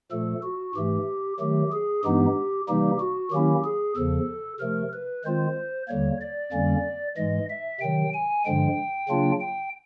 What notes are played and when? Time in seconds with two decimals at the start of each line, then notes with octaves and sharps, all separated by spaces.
0.11 A#2 F3 A3 A4
0.43 F#4
0.75 G#2 E3 A3 G4
1.39 D#3 F#3 A3 G4
1.72 G#4
2.03 G2 E3 G#3 B3 D#4 G4
2.68 C3 E3 G3 A#3 D#4 G4
3.00 F#4
3.32 D#3 F#3 A#3 C#4 E4 G4
3.64 G#4
3.96 E2 C#3 F3 A4
4.60 C3 F3 A3 A#4
4.93 B4
5.25 D#3 G#3 C4 F4 C5
5.88 D#2 D3 G3 A#3 C#5
6.21 D5
6.52 F2 D3 G3 A#3 C#4
7.17 G#2 E3 G#3 D#5
7.50 E5
7.81 C3 D#3 F#3 G5
8.13 G#5
8.45 G2 D3 F3 G#3 G5
9.09 C#3 F#3 A#3 D4 F4
9.41 G5